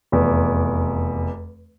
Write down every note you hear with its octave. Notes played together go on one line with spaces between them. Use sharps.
F1 E2